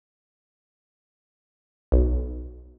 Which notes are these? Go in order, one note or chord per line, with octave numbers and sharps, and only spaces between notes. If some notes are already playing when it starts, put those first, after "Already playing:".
B1